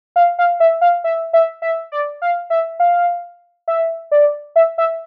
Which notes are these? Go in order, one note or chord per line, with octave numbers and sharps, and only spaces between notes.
F5
F5
E5
F5
E5
E5
E5
D5
F5
E5
F5
E5
D5
E5
E5